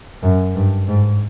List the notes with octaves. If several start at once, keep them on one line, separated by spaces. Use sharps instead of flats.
F#2
G2
G#2